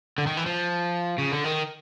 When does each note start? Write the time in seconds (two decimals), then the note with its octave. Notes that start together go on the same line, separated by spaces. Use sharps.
0.18 D3
0.27 D#3
0.37 E3
0.46 F3
1.18 C#3
1.32 D3
1.44 D#3